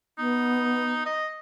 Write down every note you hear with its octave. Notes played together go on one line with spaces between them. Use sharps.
B3 D#4
D#5